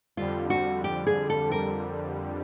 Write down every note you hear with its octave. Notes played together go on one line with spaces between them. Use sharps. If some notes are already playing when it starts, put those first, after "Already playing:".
F2 D3 G3 F4
F#4
G4
G#4
A4
A#4